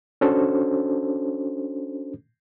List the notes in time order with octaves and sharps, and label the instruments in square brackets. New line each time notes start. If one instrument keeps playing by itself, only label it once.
[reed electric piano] C#4 D4 F#4 A4 C5